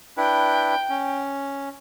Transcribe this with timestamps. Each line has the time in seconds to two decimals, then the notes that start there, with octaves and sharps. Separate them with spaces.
0.17 D4 E4 B4 G5
0.90 C#4